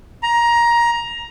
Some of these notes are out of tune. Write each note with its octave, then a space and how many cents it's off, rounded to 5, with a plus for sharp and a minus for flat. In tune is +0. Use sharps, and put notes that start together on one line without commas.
A#5 +15